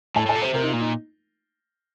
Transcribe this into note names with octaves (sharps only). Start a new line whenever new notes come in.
A2 A4
A2 A4
A#2
C3 C5
C3 A#4
D#4
F4
A#2
D#4